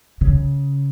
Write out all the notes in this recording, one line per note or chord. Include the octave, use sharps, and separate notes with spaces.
C#3